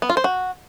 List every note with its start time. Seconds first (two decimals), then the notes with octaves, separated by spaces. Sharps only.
0.02 B3
0.09 F4
0.17 C5
0.24 F#4